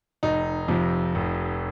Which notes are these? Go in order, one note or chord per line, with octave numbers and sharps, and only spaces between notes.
F1 D#4
F2 C3 F3
F1